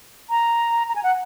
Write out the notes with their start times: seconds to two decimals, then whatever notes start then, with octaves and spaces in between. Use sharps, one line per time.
0.30 A#5
0.89 A#5
0.96 G#5
1.03 F#5